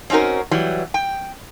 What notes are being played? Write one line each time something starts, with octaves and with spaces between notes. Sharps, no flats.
C4 C#4 D#4 F#4 A#4
E3 F#3 G3
G5